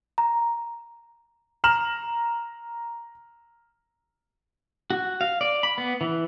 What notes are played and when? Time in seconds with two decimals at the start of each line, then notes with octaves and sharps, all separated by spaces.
0.18 A#5
1.64 A#5 F6 E7 F#7
4.90 F#4
5.21 F5
5.41 D5
5.63 B5
5.78 B3
6.01 E3